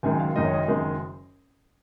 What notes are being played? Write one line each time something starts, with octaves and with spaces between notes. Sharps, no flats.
F#1 F#2 D#3 G#3 G#5
F5
F#1 F#2 D#3 G#3 D#5
C#5
D#5
F#1 F#2 D#3 G#3